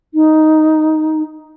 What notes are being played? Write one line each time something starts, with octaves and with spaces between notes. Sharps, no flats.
D#4